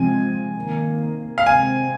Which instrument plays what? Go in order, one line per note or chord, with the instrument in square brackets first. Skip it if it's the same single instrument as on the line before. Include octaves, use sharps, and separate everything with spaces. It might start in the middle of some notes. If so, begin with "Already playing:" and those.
Already playing: [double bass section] C3 F3 G#3 C4 [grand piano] G#5
[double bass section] C3 D#3 A#3
[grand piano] F5
[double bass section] C3 G#3 C4 [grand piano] G#5